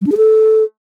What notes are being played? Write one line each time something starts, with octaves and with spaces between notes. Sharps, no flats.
G3
D4
G#4
A4